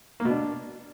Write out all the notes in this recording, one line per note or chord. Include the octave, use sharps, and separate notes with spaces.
A#3
B2
D4